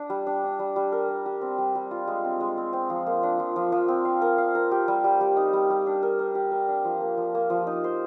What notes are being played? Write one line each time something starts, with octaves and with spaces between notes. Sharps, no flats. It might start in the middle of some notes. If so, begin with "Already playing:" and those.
Already playing: D4
G3
D4
D4
G3
G3
A#4
A#4
G4
C4
G3
G3
F4
G#3
C4
G#3
C4
C4
F3
A#3
D4
F3
F3
F3
C4
F5
A#4
F5
A#4
G4
G3
G3
G3
D#4
G3
G3
D4
A#4
A#4
G4
A#4
D4
F3
A#3
F3
A#3
F3
D#4
C5